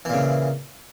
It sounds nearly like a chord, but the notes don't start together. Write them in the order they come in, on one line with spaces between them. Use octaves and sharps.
E3 A#2 C#3